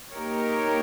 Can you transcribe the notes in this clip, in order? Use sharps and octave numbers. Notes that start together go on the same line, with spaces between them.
A#3 D#4 G4 A#4 C#5